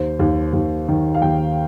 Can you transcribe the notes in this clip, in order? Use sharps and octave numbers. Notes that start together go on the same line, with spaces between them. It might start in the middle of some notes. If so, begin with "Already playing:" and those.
Already playing: D#2 C5
D#2
D#2
D#3
F5
D#2 G5